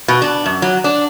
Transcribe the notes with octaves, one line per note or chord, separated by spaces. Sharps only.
B2
D4
F#2
F#3
D4